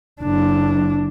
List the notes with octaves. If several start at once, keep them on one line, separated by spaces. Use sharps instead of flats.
F#1 D4